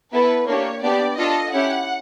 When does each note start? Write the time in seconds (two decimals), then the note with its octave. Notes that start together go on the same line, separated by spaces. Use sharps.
0.13 B3 E4 A4 B4
0.47 A#3 D4 G4 C#5
0.83 B3 D4 G4 D5
1.18 D4 F4 A4 D#5
1.53 C#4 E4 G4 F#5